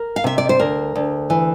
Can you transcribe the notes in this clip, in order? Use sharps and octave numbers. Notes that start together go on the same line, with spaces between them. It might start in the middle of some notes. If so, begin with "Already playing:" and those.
Already playing: A#4
F5
C3 E5
D5
C5
D2 A#4
D2
E3